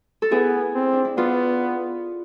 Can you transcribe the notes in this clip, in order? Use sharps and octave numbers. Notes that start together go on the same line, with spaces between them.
A4
B3 E4 G#4
C4
D4
E4
B3 D4 F4